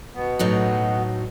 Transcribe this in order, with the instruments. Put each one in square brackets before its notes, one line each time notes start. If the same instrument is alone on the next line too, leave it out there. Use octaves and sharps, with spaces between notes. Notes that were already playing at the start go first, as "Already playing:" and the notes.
[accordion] B2 B3
[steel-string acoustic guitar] A2 F#3 D#4